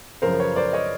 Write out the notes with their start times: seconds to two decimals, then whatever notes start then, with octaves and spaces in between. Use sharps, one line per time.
0.22 F#2 C#3 F3 A#4 C5
0.40 B4 C#5
0.56 C5 D5
0.73 C#5 D#5